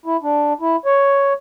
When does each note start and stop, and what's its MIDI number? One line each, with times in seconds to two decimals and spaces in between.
0.06 0.17 64
0.23 0.53 62
0.61 0.76 64
0.86 1.33 73